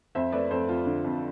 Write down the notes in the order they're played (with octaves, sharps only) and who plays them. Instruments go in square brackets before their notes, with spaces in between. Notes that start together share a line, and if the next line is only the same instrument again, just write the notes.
[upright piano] F2 C5 E5
A3 B4 D5
F2 A4 C5
F2 F4
D3
F2